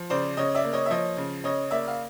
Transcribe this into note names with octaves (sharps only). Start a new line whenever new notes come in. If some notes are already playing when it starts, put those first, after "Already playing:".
Already playing: F3
C#3 C5 D5
C#3 C#5 D#5
D5 E5
A#3
C#5 D#5
E5
F3 C#5 D#5
C#3
C#3 C#5 D#5
A#3 D5 E5
F5